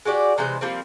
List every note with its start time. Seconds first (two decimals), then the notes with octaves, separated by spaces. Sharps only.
0.05 G#3 F#4 G4 D5
0.38 C3 E3 G#3 C5
0.61 F3 G3 A#3 C4